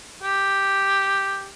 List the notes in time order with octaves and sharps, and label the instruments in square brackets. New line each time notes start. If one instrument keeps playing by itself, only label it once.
[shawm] G4